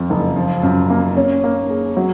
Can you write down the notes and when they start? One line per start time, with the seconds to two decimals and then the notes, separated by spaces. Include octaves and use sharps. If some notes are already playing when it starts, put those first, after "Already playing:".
Already playing: F2 F3
0.10 F#1
0.36 F3
0.63 F#2
0.90 A#3
1.17 C#4
1.44 A#3
1.70 G#4
1.97 F#3